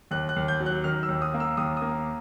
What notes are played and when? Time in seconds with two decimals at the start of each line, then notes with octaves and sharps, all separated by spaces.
0.11 D#2 F#6
0.29 F#6
0.36 D#2
0.48 G6
0.60 F#3
0.66 F#6
0.84 D#3 F6
1.03 E6
1.08 D#2
1.22 D#6
1.34 A#3
1.40 E6
1.57 D#2 D#6
1.77 A#3 D#6